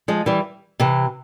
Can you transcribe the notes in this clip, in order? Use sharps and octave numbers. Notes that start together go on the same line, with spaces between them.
F3 G#3
E3 G3
C3 E3